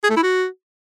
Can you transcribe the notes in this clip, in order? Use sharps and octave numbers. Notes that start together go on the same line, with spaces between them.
G#4
A3
E4
F#4